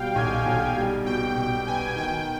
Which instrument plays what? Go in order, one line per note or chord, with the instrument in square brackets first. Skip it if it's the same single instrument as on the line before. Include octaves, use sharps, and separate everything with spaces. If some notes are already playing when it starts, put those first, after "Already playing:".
Already playing: [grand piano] B2 G3 [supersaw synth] F5 G5
[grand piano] B1 [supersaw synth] G#5
[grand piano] B1
G3
[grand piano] B2 [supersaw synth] G5
[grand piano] B2 [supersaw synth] G5
[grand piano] B3 [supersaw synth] G#5
[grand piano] D#3 [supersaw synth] G5